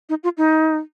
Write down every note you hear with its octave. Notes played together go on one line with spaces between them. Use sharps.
D#4
F4
D#4